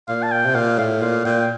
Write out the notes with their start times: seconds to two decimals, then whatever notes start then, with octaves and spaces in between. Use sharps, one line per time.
0.08 A#2 F5
0.23 A5
0.32 G5
0.45 C3
0.55 A#2 F5
0.79 A2 F5
1.02 A#2 F5
1.25 A#2 G5
1.40 G5